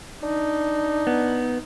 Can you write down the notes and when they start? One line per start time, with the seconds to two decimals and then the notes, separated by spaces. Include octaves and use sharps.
0.23 D4 D#4
1.07 B3